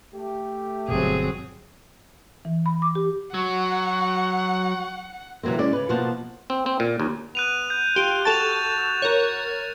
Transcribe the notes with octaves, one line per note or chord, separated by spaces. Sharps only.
A3 G4
G1 B2 F#3 C4 G#4
E3
B5
D6
G4
F#3 F#5 C#6
C3 E3 F#3 A#3 C4
G#3 C#4 D5
C#3 B4
B2 F3 A#3 C5 F#5 A5
C4
C4
A#2
D#2
B3 F#6 D#7 F7
G6
F4 G4
F#4 A4 A5 A6 E7 F7
A#4 C#5